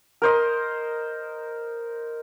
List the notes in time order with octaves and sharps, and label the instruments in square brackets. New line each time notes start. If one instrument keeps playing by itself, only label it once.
[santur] A#4 C5 D#5